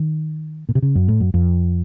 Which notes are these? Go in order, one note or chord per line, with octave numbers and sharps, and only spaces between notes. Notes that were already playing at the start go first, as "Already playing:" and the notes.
Already playing: D#3
A#2
C3
C#3
F#2
A2
F#2
F2